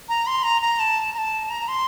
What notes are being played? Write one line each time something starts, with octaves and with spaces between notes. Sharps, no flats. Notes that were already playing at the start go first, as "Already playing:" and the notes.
A#5
C6
A#5
A#5
A5
A#5
A5
A#5
C6